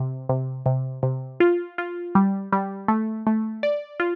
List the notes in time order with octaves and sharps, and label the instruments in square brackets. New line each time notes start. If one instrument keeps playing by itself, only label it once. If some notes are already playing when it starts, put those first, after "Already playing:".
Already playing: [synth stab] C3
C3
C3
C3
F4
F4
G3
G3
A3
A3
D5
F4